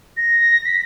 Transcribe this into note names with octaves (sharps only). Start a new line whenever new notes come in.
A#6
B6